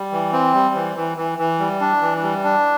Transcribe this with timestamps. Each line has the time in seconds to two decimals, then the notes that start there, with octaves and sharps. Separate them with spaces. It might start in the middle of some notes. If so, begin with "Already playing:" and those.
Already playing: G3
0.12 E3
0.33 C4
0.54 G3
0.75 E3
0.96 E3
1.18 E3
1.38 E3
1.59 G3
1.81 D4
2.01 E3
2.23 G3
2.44 D4